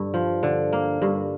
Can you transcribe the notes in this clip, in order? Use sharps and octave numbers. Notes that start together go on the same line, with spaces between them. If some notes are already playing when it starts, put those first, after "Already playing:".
Already playing: G2 D3
F3
D3
A#3
G2